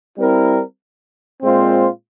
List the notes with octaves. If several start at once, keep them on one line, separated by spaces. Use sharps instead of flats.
G3 C4 E4 A#4
A#2 G#3 C4 F4 C5